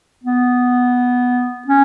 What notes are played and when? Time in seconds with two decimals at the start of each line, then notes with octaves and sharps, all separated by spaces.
0.24 B3
1.68 C#4